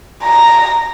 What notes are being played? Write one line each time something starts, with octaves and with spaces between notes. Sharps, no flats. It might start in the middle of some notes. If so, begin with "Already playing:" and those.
A#5